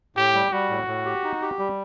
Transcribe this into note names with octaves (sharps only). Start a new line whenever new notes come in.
A2 G4
G3
G3 F#4
A2
A2
G4
D#4
G4
G3